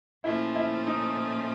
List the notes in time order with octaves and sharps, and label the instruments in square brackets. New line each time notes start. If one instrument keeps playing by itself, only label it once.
[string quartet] A#2 F3 A3 C#4 [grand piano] E4
[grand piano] E4
D#4